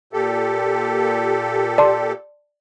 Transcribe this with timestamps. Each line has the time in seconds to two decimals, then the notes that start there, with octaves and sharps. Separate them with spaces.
0.13 A#2 G4 A4
1.78 D5 A5 C6